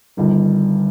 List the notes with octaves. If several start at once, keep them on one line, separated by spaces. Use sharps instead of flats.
G1 G2 D#3